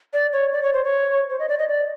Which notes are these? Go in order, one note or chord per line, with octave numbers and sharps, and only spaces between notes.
D5
C#5
D5
C#5
C5
C#5
C5
D#5
D5
D#5
D5